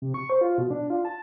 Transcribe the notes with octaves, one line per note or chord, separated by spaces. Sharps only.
C3
C#6
C5
F4
B2
D4
F4
A5